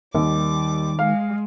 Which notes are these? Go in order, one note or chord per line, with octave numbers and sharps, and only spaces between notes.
D#2 D#3 G3 D6
G#3 F5